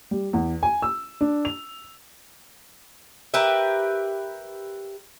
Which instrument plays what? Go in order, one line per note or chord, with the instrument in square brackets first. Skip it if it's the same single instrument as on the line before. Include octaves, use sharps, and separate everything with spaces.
[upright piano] G3
E2
G#5
E6
D4
F7
[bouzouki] G4 A#4 B4 E5